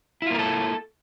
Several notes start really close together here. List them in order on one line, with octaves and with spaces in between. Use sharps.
E4 F4 A#3 A#4 A4